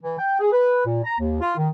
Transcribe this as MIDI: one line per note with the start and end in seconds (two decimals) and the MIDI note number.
0.02 0.17 52
0.18 0.37 79
0.39 0.50 68
0.52 0.85 71
0.85 1.00 46
1.04 1.15 82
1.19 1.40 39
1.40 1.56 65
1.57 1.69 51